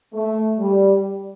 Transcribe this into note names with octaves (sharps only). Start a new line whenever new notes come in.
A3
G3